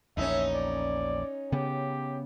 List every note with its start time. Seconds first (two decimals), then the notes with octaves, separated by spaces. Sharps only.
0.17 A#1 E2 C#4 D#4 E5
0.54 D5
1.52 C#3 B3 G4